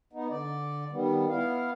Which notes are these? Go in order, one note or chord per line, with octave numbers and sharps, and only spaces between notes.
B3 D#4
D3 D5
D#3 G3 B3
B3 E4 F5